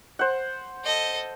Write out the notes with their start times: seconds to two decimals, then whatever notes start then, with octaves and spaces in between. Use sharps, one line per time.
0.19 C5 F#5
0.83 A4 D#5